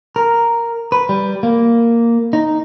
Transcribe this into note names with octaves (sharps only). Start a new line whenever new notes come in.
A#4
B4
G3
A#3
D#4